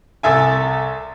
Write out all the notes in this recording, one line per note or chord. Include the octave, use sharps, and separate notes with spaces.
C2 A4 E5 G#5